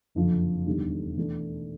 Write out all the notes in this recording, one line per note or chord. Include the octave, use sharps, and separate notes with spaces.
F#1 F2 D3 F3
E1 D#2 D3 G3
E3 A3 D4